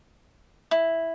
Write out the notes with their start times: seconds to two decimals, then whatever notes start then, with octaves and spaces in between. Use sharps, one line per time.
0.71 E4